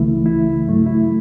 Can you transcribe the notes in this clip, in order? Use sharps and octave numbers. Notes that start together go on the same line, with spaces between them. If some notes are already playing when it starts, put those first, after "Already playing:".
Already playing: C#2 C#3 E3 A3 E4
E4
G2 F#3 A3
E4